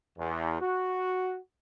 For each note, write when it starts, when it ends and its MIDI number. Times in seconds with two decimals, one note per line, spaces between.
0.18 0.60 40
0.61 1.38 66